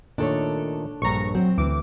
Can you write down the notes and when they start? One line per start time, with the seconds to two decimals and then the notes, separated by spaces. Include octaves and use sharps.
0.18 A#2 D#3 A3 D4 A4 C#5
1.02 A#1 G2 A#5 C#6
1.35 F#3 C4
1.58 D2 E3 D6